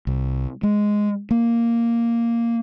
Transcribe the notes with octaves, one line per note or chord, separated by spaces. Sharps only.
C2
G#3
A#3